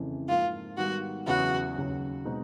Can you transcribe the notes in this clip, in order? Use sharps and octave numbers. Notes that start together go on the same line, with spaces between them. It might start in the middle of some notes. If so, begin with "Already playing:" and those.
Already playing: F2 C#3 E3 A3 C4
G#2 F3 A#3 F4
G#2 D#3 G3 B3 F#4
E2 C#3 F#3 B3 E4 F#4
D#2 C#3 F#3
B2 G#3 C4 D#4